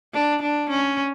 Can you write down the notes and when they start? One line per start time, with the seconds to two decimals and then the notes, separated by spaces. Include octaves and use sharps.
0.14 D4
0.42 D4
0.70 C#4